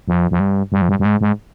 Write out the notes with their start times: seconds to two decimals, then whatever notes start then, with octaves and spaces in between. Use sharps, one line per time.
0.08 F2
0.31 F2
0.40 G2
0.72 G2
0.82 F2
0.89 G2
0.99 G2
1.05 G#2
1.21 G#2